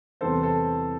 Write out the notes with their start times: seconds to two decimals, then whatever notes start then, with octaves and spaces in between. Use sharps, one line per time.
0.21 E2 C3 G3 B3 A4 C5
0.43 A4 C5